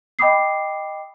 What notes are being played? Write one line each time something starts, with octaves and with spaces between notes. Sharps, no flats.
D#5 G5 B5 D6 D#6 C7